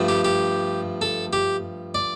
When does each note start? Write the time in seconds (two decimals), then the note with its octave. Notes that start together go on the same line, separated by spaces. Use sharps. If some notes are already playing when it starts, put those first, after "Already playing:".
Already playing: G2 F3 A3
0.08 G4
0.25 G4
1.02 A4
1.33 G4
1.95 D5